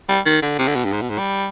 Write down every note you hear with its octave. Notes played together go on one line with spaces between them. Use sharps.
G3
D#3
D3
C3
D3
B2
G2
G#2
B2
G#2
G3